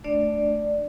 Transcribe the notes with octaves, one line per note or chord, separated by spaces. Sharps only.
A3 D4 D5